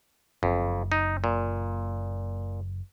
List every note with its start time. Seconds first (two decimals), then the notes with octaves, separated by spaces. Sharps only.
0.43 F#1 F2
0.92 D#4
1.24 A#2